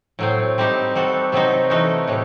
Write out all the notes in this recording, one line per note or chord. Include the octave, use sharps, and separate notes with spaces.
A2 F#3 C4
G3 C4 D#4 G4
G3 C4 F#4 A4
C3 F#3 C4 D#4 F#4
E3 A3 D#4 F#4
A2 G3